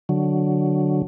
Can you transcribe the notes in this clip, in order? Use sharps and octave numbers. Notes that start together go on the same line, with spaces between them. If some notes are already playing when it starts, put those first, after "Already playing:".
D3 F#3